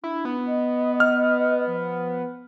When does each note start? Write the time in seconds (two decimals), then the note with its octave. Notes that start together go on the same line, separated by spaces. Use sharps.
0.04 D4 E4
0.25 B3
0.46 D#5
1.00 F6
1.67 F3